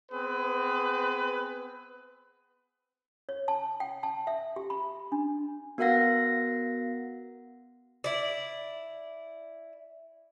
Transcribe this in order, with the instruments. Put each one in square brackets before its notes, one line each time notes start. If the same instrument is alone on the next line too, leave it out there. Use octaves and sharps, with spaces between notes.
[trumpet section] B3 C4 G#4 B4
[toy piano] C#5
A5
G5
A5
E5
G4
B5
D4
[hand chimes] B3 F#4 A#4 F5 F#5 A#6
[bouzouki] E4 D5